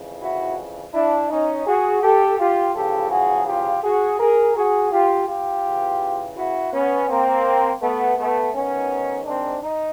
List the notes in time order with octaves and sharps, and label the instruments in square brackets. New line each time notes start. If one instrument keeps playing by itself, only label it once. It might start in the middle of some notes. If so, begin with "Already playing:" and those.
Already playing: [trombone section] F2 C#3 E3
E4 F#4
D4 E4
C#4 D#4
F#4 G#4
G4 A4
F4 G4
E2 C#3 F3 G4 A4
F#4 G#4
F4 G4
F#4 G#4
G#4 A#4
F#4 G#4
F4 G4
F4 G4
E2 C#3 E3
E4 F#4
B3 C#4
A#3 C4
A3 B3
A3 B3
G#2 D#3 B3 C#4
C4 D4
D#4